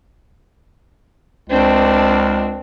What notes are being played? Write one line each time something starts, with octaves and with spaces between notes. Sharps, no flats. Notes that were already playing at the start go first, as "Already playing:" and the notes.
C#2 C4 D4